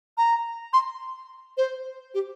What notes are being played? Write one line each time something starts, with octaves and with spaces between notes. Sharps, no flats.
A#5
C6
C5
G4